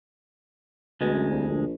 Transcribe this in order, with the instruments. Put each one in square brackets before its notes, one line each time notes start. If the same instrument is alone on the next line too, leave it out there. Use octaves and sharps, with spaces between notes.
[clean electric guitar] D2 G#3 [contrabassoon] B2
[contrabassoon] F#2
C2
A#1